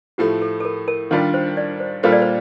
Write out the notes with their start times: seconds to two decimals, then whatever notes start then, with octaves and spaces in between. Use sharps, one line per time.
0.18 A2 F3 A3 G4
0.42 A4
0.60 A4
0.65 A#4
0.88 A#4
1.11 D#3 G3 D4 F4 A#4
1.34 C5
1.57 D5
1.80 C5
2.03 A#2 G3 A#3 F4 A4 C5
2.12 D5
2.22 C5